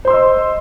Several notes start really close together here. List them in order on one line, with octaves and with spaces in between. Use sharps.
C5 C6 E6 D#5